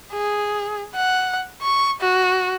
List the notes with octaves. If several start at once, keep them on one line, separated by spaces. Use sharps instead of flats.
G#4
F#5
C#6
F#4